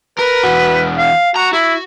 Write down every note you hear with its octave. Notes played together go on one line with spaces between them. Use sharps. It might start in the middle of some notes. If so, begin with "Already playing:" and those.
A#4 B4
E2 F#4
F5
F#4 A#5
E4 F#4